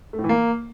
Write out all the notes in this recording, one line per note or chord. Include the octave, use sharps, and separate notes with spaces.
A3
A2
E3
A#3